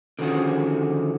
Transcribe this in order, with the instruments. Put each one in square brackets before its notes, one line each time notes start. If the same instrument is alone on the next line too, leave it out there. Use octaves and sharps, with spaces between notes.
[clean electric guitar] D3 D#3 F3 C#4 F#4 G#4